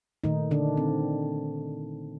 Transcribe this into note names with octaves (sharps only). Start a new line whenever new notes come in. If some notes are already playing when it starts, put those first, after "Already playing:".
A#2 D#3 A3 D#4
D3 D4
C4